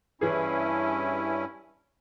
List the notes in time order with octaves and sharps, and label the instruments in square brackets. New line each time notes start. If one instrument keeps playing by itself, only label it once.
[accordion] G2 C#4 E4 [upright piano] E3 G#4